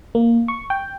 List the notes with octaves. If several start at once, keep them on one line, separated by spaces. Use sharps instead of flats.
A#3
C#6
G5